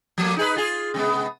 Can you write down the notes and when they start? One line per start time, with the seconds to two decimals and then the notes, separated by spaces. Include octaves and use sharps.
0.18 F3 A3 A#3
0.36 D#4 G#4 B4
0.56 F4 G#4
0.94 C3 G#3 B3